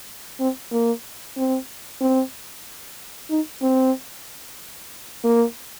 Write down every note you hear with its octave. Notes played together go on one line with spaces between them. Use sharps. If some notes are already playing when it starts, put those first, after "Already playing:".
C4
A#3
C4
C4
D#4
C4
A#3